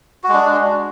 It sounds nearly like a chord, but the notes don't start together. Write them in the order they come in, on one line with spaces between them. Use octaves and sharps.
F#4 G#3 D4